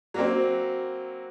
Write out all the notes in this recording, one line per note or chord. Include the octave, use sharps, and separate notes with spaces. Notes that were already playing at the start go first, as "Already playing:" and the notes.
F#3 A#3 C4